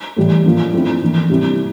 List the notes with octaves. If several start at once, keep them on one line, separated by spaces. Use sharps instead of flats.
A2 E3 G3
F3 A#3 D4
F3 A3 C4 E4
E3 A#3 D4
C3 G3 C4 E4